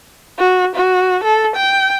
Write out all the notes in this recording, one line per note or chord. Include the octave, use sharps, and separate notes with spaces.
F#4
F#4
A4
G5